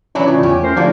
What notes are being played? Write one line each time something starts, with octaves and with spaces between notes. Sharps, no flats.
E3 F#3 C#4 D4 E4
A2 C#3 A3 F4
E2 G4 C#5 G#5
A3 C#4 A#4 C5
D3 F3 A#3 D4 E4 F#4 G4